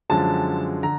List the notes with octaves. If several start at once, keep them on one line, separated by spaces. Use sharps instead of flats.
F#2 D3 F3 G#3 A5
D3 A#5